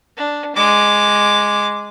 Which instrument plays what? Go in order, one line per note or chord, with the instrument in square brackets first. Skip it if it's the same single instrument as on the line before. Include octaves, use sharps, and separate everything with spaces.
[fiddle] D4
G#3 D6